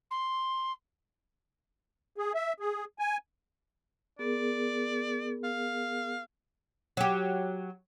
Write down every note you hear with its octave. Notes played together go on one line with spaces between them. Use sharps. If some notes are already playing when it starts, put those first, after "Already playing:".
C6
G#4
E5
G#4
G#5
B3 G#4 A#4 D5
F5
F#3 G4